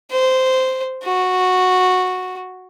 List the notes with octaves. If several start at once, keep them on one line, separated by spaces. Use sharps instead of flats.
C5
F#4